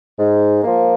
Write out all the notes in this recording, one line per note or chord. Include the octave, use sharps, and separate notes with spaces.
G#2
F3 A#3